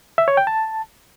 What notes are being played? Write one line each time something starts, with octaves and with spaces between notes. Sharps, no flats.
E5
C#5
G5
A5